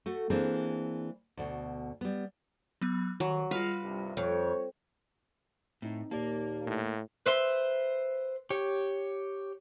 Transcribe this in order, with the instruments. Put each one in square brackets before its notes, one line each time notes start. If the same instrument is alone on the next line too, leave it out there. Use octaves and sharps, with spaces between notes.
[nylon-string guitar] A3 F#4
E3 A#3 C4 D4 G#4
D2 B2
G3 B3
[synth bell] F#3 B3 F#6
[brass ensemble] C2 [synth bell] D#3 [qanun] F#3
[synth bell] G3 F4 [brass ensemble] G#3 [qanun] B4 F5
[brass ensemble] C2 G2 C3
[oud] F2 [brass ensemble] C#5
[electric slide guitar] A2 [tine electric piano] C4 D#4
[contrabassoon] D#2 [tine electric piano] A#2 D5 A5 [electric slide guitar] A#3
[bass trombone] A2
[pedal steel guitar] B4 C5 E5 C6
G4 C#5